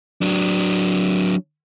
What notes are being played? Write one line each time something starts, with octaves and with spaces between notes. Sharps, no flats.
F#3 D4